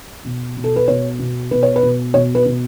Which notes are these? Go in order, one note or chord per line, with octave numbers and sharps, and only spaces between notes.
B2
B2
A4
B4
B2 C#5
B2
B2 B4
C#5
B4
B2
B2 C#5
B4
B2